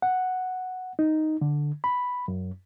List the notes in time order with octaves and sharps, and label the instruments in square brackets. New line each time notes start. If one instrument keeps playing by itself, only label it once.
[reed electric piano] F#5
D#4
D3
B5
F#2